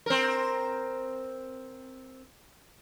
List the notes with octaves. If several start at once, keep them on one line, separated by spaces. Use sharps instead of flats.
C4 A#4